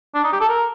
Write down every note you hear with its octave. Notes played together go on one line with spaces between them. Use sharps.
D4
D#4
G4
A4
A#4